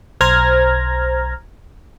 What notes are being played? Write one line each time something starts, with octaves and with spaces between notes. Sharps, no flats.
B1 C5 A#5 F6 G#6 A#6